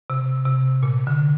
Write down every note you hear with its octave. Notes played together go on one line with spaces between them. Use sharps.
C3
C3
A#2
D3